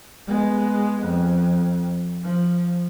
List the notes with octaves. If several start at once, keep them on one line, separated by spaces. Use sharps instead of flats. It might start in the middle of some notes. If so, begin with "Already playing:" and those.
G#3 B3
F2
F3